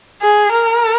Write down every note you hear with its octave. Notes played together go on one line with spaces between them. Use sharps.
G#4
A#4